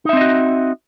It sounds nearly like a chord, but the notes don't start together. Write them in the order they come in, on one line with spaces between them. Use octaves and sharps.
D#4 E5 C4 D#5 F#4